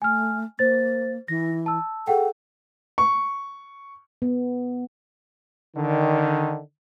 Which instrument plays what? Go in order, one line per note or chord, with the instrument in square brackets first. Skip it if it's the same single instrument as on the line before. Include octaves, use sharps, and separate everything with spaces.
[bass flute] A3 [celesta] G#5 F6
[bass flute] A#3 [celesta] C5 A6
[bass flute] E3 [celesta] A#6
[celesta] A5 E6
[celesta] G#4 F#5 G5 [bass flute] A4
[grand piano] C#6
[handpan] B3
[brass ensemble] D3 D#3